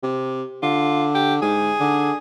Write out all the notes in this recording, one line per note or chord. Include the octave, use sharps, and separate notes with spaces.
C3
D3 F4
G4
G#2 G#4
D3